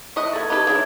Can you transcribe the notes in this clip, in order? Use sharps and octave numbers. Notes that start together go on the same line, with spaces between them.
E4 D#5 C#6 F#6
A3 B3 G#6 A6
D#4 G4 A4 B4 A5 D6 G#6
F#3 G#3 D4 E4